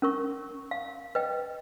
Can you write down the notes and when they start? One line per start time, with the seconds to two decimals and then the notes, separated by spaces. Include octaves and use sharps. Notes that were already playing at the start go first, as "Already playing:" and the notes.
0.02 C#4 A#4 C#6
0.71 F5
1.15 B4 D#5 G5